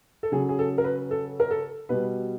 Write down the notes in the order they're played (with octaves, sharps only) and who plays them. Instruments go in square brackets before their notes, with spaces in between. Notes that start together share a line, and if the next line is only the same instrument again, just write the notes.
[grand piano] A4
C#3 F#3 G#4
G#4
A4
A#4
B4
A4
A#4
A4
B2 G3 B4